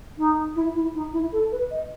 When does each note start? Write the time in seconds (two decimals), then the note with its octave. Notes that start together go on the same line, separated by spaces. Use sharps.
0.18 D#4
0.55 E4
0.75 E4
0.94 D#4
1.13 E4
1.32 A4
1.51 B4
1.71 D#5